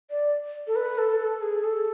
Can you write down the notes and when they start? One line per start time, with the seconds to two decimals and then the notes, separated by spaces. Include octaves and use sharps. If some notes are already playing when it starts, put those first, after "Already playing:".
0.10 D5
0.67 A4
0.76 B4
0.98 A4
1.20 A4
1.42 G#4
1.64 A4